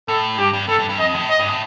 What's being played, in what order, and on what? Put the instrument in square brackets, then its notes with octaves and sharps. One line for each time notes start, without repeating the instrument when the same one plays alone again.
[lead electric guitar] A2 [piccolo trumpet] A4
[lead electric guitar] G2 [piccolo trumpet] G4
[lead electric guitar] G2
[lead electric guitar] G2 [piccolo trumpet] A4
[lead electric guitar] G2
G2
[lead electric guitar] F2 [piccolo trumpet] D#5
[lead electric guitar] A2
[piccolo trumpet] D#5
[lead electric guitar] G2
A2